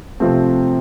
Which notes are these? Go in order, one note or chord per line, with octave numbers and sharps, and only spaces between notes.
C3 F3 A3 C4